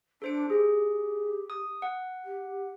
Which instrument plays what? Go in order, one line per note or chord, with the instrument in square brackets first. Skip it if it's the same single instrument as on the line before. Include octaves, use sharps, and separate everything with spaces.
[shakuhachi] D4 [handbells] A4 C5 D7
[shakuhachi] G4 [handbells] G#4
[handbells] D#6
F#5
[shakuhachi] G4